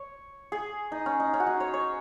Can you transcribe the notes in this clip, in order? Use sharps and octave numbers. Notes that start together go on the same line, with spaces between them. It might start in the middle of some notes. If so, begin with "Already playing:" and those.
Already playing: C#5
G#4
D#4
C#4
D#4
C#4
F#4
D#4
C#5
C#5